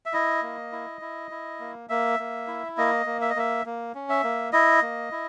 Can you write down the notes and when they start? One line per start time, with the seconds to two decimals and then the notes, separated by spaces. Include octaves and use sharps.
0.06 E5
0.13 E4 D#5
0.42 A#3
0.72 E4
1.01 E4
1.31 E4
1.60 A#3
1.89 A#3 E5
2.19 A#3
2.47 E4
2.77 A#3 D#5
3.06 A#3
3.21 E5
3.30 D#5
3.36 A#3 E5
3.66 A#3
3.95 C#4
4.09 E5
4.24 A#3
4.52 E4 D#5
4.82 A#3
5.12 E4